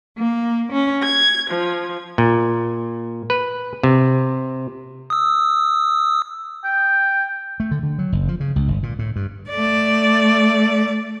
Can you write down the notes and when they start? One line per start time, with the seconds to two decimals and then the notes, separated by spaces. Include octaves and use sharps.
0.19 A#3
0.72 C#4
1.04 G#6
1.49 F3
2.18 A#2
3.30 B4
3.83 C3
5.10 D#6 E6
6.65 G5
7.60 A3
7.71 D3
7.83 D3
7.99 F#3
8.12 F#1
8.28 F3
8.40 C#3
8.56 C#2
8.68 G1
8.83 A#2
8.99 A2
9.16 G2
9.50 A3 D5